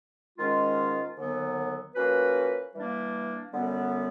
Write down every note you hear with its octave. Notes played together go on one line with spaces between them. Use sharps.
G#2 D#3 G#3 C#4 F4
D#2 D3 F#3 B3
F3 A#3 C#4 F#4 B4
E3 G3 A#3 D4
F#2 D3 G3 B3